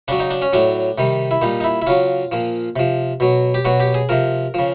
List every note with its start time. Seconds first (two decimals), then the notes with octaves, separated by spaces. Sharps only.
0.08 C#3 F#3 D4
0.20 D#4
0.31 D4
0.42 C#4
0.53 A2 F#3 D4
0.98 C3 D#3 G3
1.31 E4
1.41 A#2 G3 D#4
1.60 D#4
1.64 E4
1.82 E4
1.87 C#3 F#3 F4
2.32 A#2 F3
2.76 C3 F3
3.20 B2 F#3
3.54 G4
3.65 B2 F#3 F#4
3.80 G4
3.94 G#4
4.09 C3 F3 A#4
4.54 C#3 F3